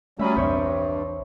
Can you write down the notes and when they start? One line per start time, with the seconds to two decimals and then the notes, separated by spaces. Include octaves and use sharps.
0.19 F#3 G3 A3 C#4 E5 B5 D#6
0.36 A#1 E2 G2 C4 C#5 E5